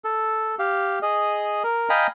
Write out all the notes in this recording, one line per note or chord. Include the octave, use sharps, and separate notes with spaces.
A4
G4 F5
G#4 D#5
A#4
D#5 F5 G5 G#5 A#5 B5